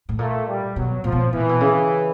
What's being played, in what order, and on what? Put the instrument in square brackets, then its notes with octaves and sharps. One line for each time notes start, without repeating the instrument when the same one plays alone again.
[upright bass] A2
[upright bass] A#2 [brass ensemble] A3
[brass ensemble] G3
[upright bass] B2 [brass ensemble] F#3
[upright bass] A#2 [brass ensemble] F3
[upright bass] B2
A#2
[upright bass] B2 [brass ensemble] E3
[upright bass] A#2
B2
C#3